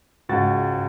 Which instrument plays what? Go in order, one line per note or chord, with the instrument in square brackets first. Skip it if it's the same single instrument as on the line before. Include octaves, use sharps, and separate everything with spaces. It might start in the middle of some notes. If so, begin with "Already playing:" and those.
[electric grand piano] C#2 F#4 A6 [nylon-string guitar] G#2